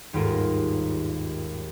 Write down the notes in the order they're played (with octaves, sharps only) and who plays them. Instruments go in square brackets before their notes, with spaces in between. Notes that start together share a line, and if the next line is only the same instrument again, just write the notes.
[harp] G1 D#2 G#2 F4 A#4 C5